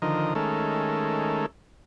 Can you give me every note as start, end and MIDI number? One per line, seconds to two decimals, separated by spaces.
0.02 0.34 50
0.02 0.34 51
0.02 0.34 53
0.02 0.34 70
0.02 0.34 75
0.35 1.46 51
0.35 1.46 56
0.35 1.46 57
0.35 1.46 61
0.35 1.46 69
0.35 1.46 70